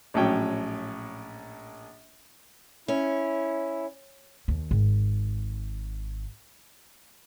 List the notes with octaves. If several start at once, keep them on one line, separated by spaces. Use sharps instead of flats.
A#1 A2 F#3 C#4 G5
C#4 E4
D#2
G#1